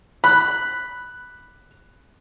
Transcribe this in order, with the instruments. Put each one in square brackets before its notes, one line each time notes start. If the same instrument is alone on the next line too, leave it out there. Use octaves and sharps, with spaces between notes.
[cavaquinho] B5 [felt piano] F#6